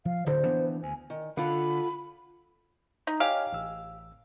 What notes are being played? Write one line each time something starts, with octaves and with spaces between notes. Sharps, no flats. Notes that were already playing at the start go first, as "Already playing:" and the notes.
F3 F5
D1 D3 C5
E3 B3 D4
D2 G#5
D#3
D3 F4 A4 F#5 B5
D#4
G4 C#5 D#5 F5 G#5
A1 E6